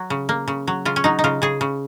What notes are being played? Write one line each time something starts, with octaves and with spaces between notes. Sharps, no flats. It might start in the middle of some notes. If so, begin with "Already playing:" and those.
Already playing: F#3
C#3
A#3
C#3
F#3
C#3 F4
C#4
F#3 D#4
D#4
C#3 F4
C#3 G#4
C#3